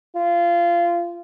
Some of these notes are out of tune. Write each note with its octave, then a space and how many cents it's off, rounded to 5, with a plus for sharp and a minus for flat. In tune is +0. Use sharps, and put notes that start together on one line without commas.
F4 -20